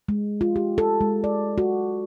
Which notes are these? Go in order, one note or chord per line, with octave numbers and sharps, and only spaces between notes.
G#3
F4
G4
A4
G#3
D5
F#4